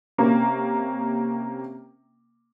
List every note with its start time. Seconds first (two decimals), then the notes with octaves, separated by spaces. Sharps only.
0.18 C3 A#3 C#4